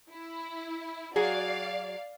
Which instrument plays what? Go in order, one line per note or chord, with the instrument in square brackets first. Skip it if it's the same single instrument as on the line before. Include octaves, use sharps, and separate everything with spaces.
[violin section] E4
[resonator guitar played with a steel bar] F#3 F#4 G#4 [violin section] D5 F5